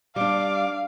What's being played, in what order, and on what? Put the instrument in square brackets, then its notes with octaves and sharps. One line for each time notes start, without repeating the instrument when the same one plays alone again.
[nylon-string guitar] G3 D4 [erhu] F5 [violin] D6